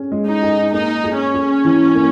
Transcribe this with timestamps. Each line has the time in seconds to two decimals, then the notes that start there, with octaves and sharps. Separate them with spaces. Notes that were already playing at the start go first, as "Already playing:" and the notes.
Already playing: C#4 G#4
0.12 G#3
0.26 D#4
0.43 G#4
0.72 A#3 D#4
1.04 G#4
1.19 C#4
1.34 G#4
1.65 E3
1.95 A#3